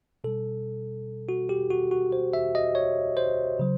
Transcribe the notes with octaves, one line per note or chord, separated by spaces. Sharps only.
B2 G3 A4
F#4
G4
F#4
F#4
C5
E5
D#5
C#5
C5
C#3 F#3